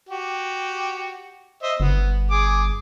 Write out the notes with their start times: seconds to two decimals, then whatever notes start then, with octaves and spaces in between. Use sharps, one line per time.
0.09 F#4 G4
1.63 C5 D#5 E5
1.80 G1 B3
2.31 G#4 D6